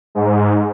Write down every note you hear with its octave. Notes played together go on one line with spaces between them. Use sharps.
G#2